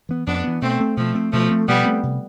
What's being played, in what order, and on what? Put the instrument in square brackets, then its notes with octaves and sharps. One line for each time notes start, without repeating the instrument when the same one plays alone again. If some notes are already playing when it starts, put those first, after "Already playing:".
[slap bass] E3 B3
[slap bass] F2 [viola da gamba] B3 D4
[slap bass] E3 B3
[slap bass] B2 [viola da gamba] A3 C4
[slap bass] A3 C4
[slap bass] B2 [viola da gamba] F3 A3
[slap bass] A3 C4
[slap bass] B2 [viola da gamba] F3 A3
[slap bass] A3 C4
[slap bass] B2 [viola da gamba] G3 B3
[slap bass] A3 C4
C3